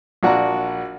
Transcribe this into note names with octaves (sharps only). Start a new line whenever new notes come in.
A#1 F#4 D5 A#5